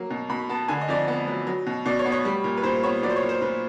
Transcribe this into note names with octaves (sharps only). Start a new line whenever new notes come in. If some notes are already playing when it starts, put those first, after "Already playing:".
Already playing: F#3 A#3
B2
B2 B5
B3 A5
D3 G#5
D#5
F2 D5
D#5
B3
F#3
F#3
B2
B2 D5
C#5
B3
C#5
G3
A#2
B4
A#2 C5
B3 C#5
F#3 D5
C5
C#5
A#2
C5
A#2 B4